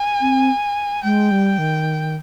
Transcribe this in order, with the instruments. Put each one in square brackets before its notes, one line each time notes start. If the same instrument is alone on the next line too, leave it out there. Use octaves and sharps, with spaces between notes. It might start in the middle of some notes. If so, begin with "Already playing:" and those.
Already playing: [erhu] G#5
[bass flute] C4
[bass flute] G#3 [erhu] G5
[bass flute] G3
D#3